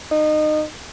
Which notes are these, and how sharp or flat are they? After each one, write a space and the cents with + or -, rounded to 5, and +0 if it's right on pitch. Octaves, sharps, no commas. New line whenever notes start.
D#4 -25